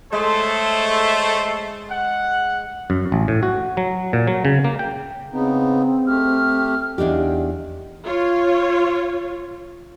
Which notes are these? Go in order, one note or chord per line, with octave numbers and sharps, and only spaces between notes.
G#3 A3 A4 C5 C#5
F#5
F#2
A1
A2
F#4
F#3
A#2
F#3
C#3
A#3
G5
C#3 B3 C4 D#4
A3 G4 F6
E2 D4 D#4 G4
F4 C#5